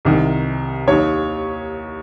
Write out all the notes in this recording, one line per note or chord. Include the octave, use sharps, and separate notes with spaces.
C2 C3 D#3
D#2 D#3 C#5